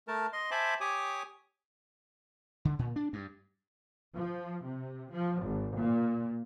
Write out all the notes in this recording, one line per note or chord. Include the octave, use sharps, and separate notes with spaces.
A3 A#4 A5
D#5 C6
C5 E5 G#5 A5 B5 D6
G4 C#5 G#5 D6 D#6
D3
A#2
D4
G2
F3
C3
F3
G#1
A#2